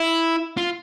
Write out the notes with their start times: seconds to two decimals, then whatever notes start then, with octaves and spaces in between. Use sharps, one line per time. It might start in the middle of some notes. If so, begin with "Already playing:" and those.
Already playing: E4
0.57 F4